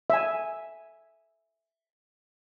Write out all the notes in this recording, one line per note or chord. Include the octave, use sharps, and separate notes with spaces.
E5 G#5